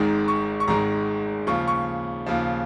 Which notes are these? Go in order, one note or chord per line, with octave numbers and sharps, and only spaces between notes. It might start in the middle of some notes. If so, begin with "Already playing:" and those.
Already playing: G#1 G#2 D#3 G#3 A#5
C#6
C#6
G#1 G#2 D#3 G#3 A#5
D#2 C#3 F3 C#6
C#6
D#2 C#3 F3